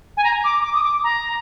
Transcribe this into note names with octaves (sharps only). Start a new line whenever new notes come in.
G#5
A#5
D6
D6
D#6
D6
A#5